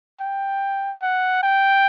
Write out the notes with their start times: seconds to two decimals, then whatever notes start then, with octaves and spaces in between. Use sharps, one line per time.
0.20 G5
1.02 F#5
1.43 G5